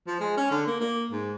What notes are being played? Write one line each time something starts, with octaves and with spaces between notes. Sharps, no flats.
F3
G#3
C#4
D3
A#3
A#3
G#2